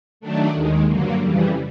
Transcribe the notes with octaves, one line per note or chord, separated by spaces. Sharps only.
D#3 F#3 A3 D4
D#2 D#3 G#3
G2 D3 F#3 A#3
F2 C#3 E3 G3